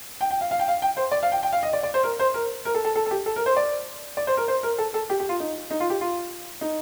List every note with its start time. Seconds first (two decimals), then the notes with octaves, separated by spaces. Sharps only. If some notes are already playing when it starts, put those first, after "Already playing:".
0.21 G5
0.31 G5
0.41 F5
0.51 F5
0.59 G5
0.68 F5
0.82 G5
0.97 C5
1.12 D5
1.23 F5
1.32 G5
1.43 G5
1.53 F5
1.63 D#5
1.73 D5
1.83 D5
1.94 C5
2.04 A#4
2.19 C5
2.34 A#4
2.65 A#4
2.75 A4
2.85 A4
2.95 A4
3.06 A4
3.11 G4
3.26 A4
3.36 A#4
3.46 C5
3.57 D5
4.17 D5
4.27 C5
4.37 A#4
4.48 C5
4.63 A#4
4.78 A4
4.94 A4
5.10 G4
5.20 G4
5.29 F4
5.40 D#4
5.71 D#4
5.80 F4
5.90 G4
6.01 F4
6.61 D#4